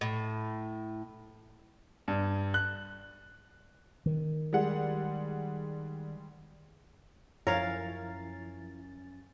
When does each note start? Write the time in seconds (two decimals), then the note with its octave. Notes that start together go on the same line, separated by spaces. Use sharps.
0.01 A2
2.08 G2
2.54 F#6
4.06 D#3
4.53 G3 G#3 F#5
7.47 F#2 F3 C#4 E4 A#4 C#5 F5 A6